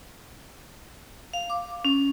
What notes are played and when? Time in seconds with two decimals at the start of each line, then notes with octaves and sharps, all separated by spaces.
1.34 F5
1.50 D6
1.85 C#4